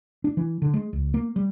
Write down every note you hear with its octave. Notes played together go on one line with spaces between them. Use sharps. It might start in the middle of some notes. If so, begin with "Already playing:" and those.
D4
E3
D3
G#3
C#2
A#3
G3